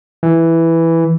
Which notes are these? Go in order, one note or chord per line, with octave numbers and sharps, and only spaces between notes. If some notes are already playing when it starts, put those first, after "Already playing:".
E3